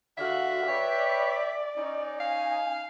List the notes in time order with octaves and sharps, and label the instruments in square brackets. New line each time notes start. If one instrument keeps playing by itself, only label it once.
[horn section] D3 F5 [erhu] F#4 [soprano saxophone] E5
[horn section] B4 C#5 G5 [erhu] D5
[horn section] C#4 D#4
[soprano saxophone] F5 [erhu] G#5